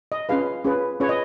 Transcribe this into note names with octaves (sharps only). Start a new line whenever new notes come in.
D#5
C#4 F4 G#4 B4 F5
C#4 F4 G#4 B4
C#4 F4 G#4 B4 C#5
D#5